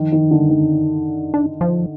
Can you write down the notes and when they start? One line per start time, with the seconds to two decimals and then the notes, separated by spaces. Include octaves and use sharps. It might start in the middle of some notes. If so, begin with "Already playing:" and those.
Already playing: D#3 F3
0.12 D#3
0.31 D3
0.38 G3
0.49 D#3 G#3
0.63 C4
0.78 D#4
0.91 D4
1.05 D#4
1.19 D4
1.34 D4
1.61 F3